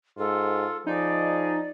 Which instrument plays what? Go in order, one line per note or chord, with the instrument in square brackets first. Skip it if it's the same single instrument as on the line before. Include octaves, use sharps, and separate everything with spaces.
[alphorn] G#2 [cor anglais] F4 [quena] A4
[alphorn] F3 [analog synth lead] D#4 [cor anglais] G#4 [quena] D5